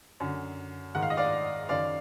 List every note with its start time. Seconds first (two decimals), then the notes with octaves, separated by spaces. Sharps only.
0.20 F#2 D3
0.95 G#2 D#3 F#5
1.02 F5
1.10 D#5
1.17 D5 F5
1.69 F#2 D#3 D5 F5